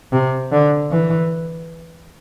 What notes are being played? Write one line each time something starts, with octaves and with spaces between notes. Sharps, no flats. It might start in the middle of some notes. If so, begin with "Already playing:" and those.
C3
D3
E3